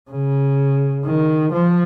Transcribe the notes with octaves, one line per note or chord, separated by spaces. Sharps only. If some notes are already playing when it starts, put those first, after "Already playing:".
C#3
D#3
F3